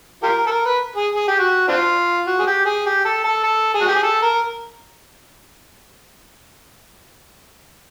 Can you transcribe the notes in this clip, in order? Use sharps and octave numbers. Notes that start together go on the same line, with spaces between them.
F4 G4 A#4
A4
A#4
B4
G#4
G#4
G4
F#4
C4 D4 F4
F#4
G#4
G4
G#4
G4
A4
A4
A4
G#4
F#4
G4
G#4
A4
A#4